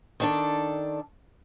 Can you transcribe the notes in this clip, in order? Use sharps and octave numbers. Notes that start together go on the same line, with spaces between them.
D#3 D4 A4